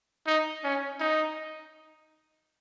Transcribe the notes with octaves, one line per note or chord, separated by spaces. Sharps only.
D#4
C#4
D#4